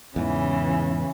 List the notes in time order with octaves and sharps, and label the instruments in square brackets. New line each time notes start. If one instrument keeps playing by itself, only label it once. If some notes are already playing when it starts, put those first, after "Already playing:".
[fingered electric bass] E2 G#2 [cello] C#3 E3